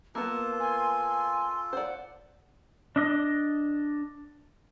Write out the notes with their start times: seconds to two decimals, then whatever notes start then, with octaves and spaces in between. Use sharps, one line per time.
0.15 A#3 B3 F4 A4 A5
0.59 G#5 C6
0.93 C6
1.73 C5 D5 F#5
2.96 D4 D#5